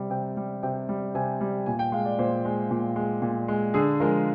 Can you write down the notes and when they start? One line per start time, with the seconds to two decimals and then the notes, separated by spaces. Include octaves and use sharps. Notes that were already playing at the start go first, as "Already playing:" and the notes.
Already playing: C3 G3
0.10 C3 G5
0.37 G3
0.63 C3 G5
0.89 G3
1.15 C3 G#5
1.40 G3
1.66 A#2 G#5
1.79 G5
1.92 G#3 F5
2.05 D5
2.19 A#2 C5
2.45 G#3
2.71 A#2
2.96 G#3
3.22 A#2
3.48 G#3
3.74 D3 G#4
4.00 F3 G#3 A#4